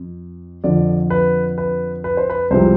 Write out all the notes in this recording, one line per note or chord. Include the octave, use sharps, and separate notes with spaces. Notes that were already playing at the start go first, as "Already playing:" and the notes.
Already playing: F2
F2 D3 F3 D5
B4
B4
B4
C5
B4
C2 C3 F3 G#3 C5